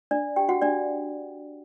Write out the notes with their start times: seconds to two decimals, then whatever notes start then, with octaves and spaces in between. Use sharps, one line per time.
0.11 D4 D5
0.36 G4 G5
0.49 F#4 F#5
0.62 D4 D5